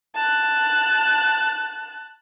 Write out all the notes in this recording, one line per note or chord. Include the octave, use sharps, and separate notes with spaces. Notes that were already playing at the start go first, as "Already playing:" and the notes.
A5 F#6